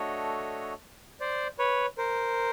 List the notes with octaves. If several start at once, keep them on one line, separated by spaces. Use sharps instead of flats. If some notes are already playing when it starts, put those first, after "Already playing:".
Already playing: A3 D4 F#4 A4 C#5 D#5
C5 D5
B4 C#5
A#4 C5